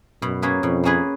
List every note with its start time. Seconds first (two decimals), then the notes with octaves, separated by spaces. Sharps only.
0.22 F#2 B2
0.42 A#3 C#4 G#4 B4
0.63 F2 B2
0.84 A#3 C#4 G#4 B4